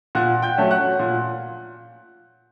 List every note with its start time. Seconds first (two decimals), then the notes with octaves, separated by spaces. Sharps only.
0.15 A#2 F#5 F#6
0.42 G5 G6
0.58 F#3 A3 C#4
0.71 F#5 F#6
0.99 A#2